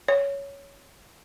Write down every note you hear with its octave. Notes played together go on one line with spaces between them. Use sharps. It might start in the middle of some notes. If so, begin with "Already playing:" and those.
C#5